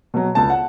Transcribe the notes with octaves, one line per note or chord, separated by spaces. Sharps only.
B2 F#3
C#2 A5
F#5